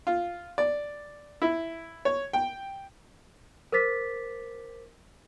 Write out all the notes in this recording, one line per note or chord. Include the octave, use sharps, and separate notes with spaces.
F4
D5
E4
C#5
G5
A#4 C5 D6 A6 B6